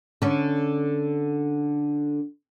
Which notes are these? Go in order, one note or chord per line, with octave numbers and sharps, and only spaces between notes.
D3 C#4